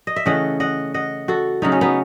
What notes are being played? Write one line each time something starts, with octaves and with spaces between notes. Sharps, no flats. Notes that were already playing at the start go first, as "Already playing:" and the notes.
D#5
E5
C#3 E3 A3 D#5 F#5
D#5 F#5
D#5 F#5
F#4 A4
C#3 F#3 A3 D#4
C#4
B3 D#4